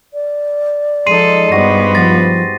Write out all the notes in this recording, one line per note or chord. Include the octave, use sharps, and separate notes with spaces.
D5
F3 G#3 D#4 A4 C6 C7 D#7
G2 B3 F#4 G4 C5 A#6
F3 A6 A#6